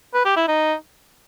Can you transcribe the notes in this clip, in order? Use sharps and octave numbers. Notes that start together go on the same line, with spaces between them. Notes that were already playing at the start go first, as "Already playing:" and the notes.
B4
G4
E4
D#4